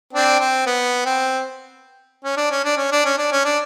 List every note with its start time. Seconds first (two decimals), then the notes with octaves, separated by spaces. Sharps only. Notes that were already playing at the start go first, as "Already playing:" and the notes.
0.13 C4 D4
0.39 C4
0.66 B3
1.05 C4
2.24 C#4
2.37 D4
2.51 C#4
2.64 D4
2.77 C#4
2.92 D4
3.05 C#4
3.18 D4
3.32 C#4
3.45 D4